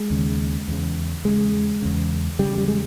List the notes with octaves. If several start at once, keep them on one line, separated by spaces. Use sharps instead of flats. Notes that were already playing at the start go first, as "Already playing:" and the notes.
Already playing: G#3
D#2 C#3
E2 C#3
E2 C#3 G#3
E2 C#3
E2 C#3 G3
G3
G#3